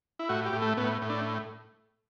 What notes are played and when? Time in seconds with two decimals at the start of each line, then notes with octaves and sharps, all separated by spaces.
0.19 E4
0.29 A2 F#4
0.46 G4
0.53 A2
0.62 A3
0.77 A2 B3
1.02 A2
1.10 D4